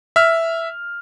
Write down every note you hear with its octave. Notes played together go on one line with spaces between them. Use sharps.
E5 F6